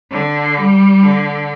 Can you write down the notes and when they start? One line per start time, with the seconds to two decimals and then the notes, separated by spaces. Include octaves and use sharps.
0.11 D3
0.57 G3
1.03 D3